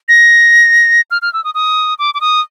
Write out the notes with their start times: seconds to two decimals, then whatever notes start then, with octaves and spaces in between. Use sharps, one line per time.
0.08 A#6
1.11 F6
1.22 F6
1.33 E6
1.44 D#6
1.54 D#6
1.99 D6
2.14 D6
2.21 D#6